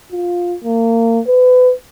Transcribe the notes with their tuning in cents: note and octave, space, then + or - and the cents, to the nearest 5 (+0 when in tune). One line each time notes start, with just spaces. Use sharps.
F4 +10
A#3 -30
B4 +30